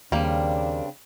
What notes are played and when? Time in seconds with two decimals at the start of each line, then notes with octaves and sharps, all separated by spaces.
0.12 D#2 C#3 G3 A#3 C4 D4